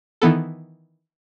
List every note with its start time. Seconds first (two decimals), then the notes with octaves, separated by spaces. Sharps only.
0.22 D#3 E3 B3 A4